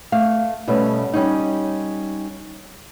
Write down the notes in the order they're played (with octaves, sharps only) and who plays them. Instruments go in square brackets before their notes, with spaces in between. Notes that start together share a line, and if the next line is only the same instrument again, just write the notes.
[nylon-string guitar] A3 F5
B2 G3 A3 B3 C#4
G3 C#4 D#4